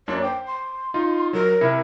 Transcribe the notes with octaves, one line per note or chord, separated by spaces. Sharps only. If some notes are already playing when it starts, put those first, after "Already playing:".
F#2 A#3 D4 C#5
C5 G5 D6
C6
D#4 F4
F#3 A#4
C3 E4 C#7